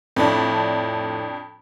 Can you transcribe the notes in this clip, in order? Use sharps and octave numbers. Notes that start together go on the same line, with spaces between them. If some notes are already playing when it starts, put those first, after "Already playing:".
F2 A2 D4